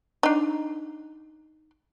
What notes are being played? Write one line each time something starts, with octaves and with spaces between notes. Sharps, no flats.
D4 D#4